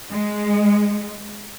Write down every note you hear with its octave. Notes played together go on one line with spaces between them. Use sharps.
G#3